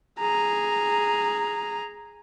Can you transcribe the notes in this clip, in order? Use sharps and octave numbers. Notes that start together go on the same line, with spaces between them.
G#4 A#5